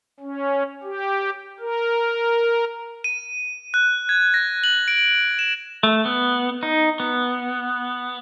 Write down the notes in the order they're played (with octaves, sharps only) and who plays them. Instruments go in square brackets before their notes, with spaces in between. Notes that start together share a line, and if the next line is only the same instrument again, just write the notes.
[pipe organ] C#4
G4
A#4
[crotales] D#7
F#6
G#6
A#6
F#7
D7
E7
[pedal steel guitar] A3
B3
D#4
B3